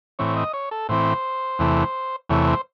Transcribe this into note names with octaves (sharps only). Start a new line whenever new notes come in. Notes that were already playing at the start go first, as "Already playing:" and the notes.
A2 E3 C4 C#5
D#5
C#5
A4
A2 E3 C4 C5
E2 C3 E3 A3
E2 C3 E3 A3 C#5
C5